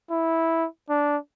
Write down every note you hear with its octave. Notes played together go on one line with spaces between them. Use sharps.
E4
D4